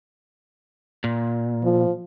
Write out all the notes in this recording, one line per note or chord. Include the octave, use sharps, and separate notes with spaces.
A#2
F3